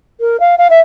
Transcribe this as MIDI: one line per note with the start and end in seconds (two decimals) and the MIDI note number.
0.20 0.37 70
0.40 0.55 77
0.58 0.67 77
0.70 0.80 76